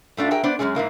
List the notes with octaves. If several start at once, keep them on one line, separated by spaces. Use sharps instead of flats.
A2 A3 D4 F4
F#4 G#4 A#4 E5 G5
B3 D4 C5 D5
F#2 D3 G#3 C#4 G#4
G#2 E3 A#3 E4